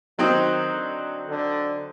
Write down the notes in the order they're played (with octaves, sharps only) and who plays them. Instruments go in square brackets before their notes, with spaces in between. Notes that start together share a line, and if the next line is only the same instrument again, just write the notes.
[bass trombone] D#3 [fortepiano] F#3 C4 D#4
[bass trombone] D3
D3